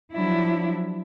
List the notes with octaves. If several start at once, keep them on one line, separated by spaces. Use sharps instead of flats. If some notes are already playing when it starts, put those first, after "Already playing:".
F3 F#3 D4 E4